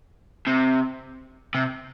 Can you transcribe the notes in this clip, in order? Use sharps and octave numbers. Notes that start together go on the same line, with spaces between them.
C3
C3